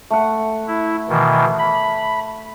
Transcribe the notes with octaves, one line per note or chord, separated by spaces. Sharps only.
A3 F#5
E4
B2 D#3 E3
B5